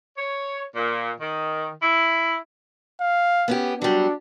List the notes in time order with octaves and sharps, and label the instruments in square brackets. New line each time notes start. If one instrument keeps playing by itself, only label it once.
[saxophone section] C#5
A#2
D#3
E4
[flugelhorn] F5
[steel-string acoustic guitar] B3 C#4 G4
[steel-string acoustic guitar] F#3 G3 [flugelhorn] D4